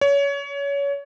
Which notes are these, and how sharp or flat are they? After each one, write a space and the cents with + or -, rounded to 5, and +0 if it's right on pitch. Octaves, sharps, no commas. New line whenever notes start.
C#5 +25